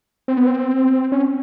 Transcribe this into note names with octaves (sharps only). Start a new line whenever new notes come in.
C4
B3
C4
C#4